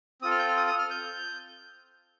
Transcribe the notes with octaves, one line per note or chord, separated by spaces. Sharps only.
C4 F4 A4 D#6
F6
G6
F6
D#6
D#6
F6
G6